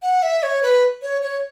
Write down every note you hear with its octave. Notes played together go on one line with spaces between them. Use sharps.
F#5
E5
C#5
B4
C#5
C#5